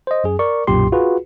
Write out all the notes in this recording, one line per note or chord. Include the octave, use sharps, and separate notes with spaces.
C5 D#5
F#2 G#4
A#4 D5 C#6
B1 F#2 A#2 G4 C6
F4 F#4 G#4 B4